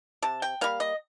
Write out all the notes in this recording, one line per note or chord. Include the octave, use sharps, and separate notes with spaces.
C3 A5
G5
G3 A#3 F5
D#5